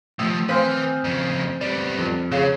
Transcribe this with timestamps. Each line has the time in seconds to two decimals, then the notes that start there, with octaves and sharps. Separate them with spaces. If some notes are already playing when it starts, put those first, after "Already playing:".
0.19 C3 F3 A3 D#6 E6
0.49 C4 B4 C5 F5 G#5 C6 D#6 F6
1.04 F2 C#3
1.61 G3 B3 D5
1.98 F2
2.32 C#3 G#4 C#5 F5